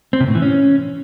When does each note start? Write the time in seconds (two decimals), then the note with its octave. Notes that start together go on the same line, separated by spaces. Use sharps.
0.13 C4
0.20 C3
0.28 A2
0.35 E3
0.42 C#4